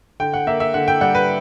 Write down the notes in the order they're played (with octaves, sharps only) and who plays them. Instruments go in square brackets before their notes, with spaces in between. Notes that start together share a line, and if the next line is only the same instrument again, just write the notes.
[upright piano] D3 G5
F#5
A#3 E5
E5
D3 F#5
G5
G3 F#5
B4